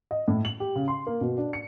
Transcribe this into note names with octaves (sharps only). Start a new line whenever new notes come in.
D#5
A2
F#7
G4
C#3
C6
A#3
B2
D4
C#7